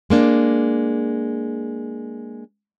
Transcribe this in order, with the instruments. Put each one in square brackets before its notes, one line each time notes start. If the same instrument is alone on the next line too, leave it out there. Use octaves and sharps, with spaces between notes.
[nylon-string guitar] G#3 A#3 D4